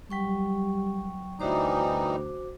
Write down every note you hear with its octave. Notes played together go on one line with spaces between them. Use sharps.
F#3 G3 G5 C#6
D2 E3 G3 D#4 F#4 C5 D6